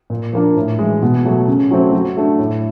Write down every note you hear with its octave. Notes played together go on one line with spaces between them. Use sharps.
A#2
F3 A#3 D4
A2
E3 G#3
B2
F#3 A3
C#3
F#3 A3 C4
F#3
A3 D4
A2